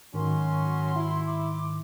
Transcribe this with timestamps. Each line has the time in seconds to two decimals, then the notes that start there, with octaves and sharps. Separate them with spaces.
0.14 G#2 D#3 F#3 C#4 F#4 C6
0.95 E4
1.25 C6 D6